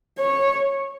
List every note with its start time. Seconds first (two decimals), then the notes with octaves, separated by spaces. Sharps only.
0.19 C#5